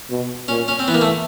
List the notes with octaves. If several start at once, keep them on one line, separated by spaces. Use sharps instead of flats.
B2
A#2 C#4
C#4
C4
E3 B3
A#3
A3